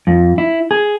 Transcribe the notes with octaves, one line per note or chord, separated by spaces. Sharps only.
F2
E4
G#4